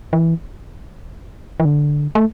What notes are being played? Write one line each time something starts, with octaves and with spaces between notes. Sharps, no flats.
E3
E3
D3
A3